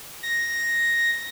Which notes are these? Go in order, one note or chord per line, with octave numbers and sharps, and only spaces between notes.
A#6